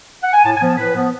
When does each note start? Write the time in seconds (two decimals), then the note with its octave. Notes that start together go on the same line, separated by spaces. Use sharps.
0.23 F#5
0.33 G#5
0.45 A2 A5
0.56 G#5
0.62 F3 B3
0.67 A5
0.78 A2 B4
0.95 F3 B3